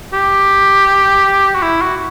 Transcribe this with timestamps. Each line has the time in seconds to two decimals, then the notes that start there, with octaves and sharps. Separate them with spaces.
0.13 G4
1.55 F#4
1.63 E4
1.81 F#4